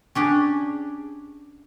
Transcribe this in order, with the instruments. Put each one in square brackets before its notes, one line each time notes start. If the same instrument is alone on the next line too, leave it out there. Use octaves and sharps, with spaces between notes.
[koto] C#4 D4 G4 G#4